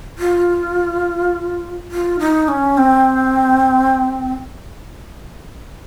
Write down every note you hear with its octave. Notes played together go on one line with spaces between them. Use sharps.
F4
F4
D#4
C#4
C4